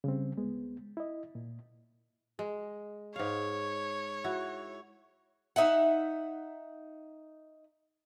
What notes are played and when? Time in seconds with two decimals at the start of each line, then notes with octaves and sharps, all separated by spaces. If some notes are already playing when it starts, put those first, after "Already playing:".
0.04 C#3 G3 C4
0.37 D2 G#3 B3
0.97 E4 D#5
1.35 A#2
2.39 G#3
3.16 G#2 C#5 F5
4.24 E4 F#4
5.56 D#4 E5 F#5